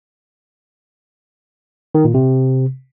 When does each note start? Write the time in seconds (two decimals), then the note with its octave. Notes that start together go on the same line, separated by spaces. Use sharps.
1.95 D#3
2.04 A#2
2.14 C3